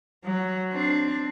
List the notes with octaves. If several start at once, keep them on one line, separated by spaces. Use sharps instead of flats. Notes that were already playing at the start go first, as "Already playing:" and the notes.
F#3
C4 D4